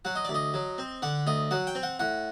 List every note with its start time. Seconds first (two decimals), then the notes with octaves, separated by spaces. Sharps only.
0.05 F#3 F#5
0.15 D#5
0.25 D2 D5
0.34 D#5
0.54 F#3
0.78 C4
1.02 D3 F#5
1.27 D2 D#5
1.51 F#3 F#5
1.67 G5
1.75 C4
1.83 F#5
1.99 A2 F#5